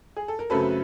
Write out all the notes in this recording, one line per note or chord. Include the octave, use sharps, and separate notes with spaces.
G#4
A4
A#4
F#2 C#3 F#3 A3 C4 A4 B4